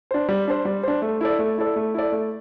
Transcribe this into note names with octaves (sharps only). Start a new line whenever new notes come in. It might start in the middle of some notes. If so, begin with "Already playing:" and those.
D4 C5
G3
D4 C5
G3
D4 C5
A3
E4 A4 D5
A3
E4 A4 D5
A3
E4 A4 D5
A3